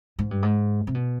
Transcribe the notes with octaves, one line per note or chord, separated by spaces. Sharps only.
G#2
G2
G#2
C3
B2